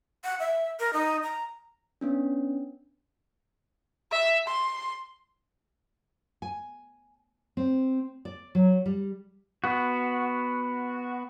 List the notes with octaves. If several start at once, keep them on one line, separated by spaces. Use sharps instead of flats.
F#5
E5
A#4
D#4
A#5
B3 C#4 D4
E5
C6
G#5
C4
D5
F#3
G3
B3 F#4